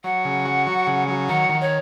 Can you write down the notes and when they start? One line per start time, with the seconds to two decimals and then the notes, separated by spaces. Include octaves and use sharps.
0.04 F#3 F#5
0.25 C#3
0.45 F#4
0.67 F#3
0.87 C#3
1.08 F#3
1.28 D#3 F#5
1.49 D#3
1.61 C#5